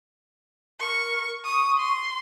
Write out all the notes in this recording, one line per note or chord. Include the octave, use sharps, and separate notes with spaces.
A#4 C#6
C#6 D#6
C6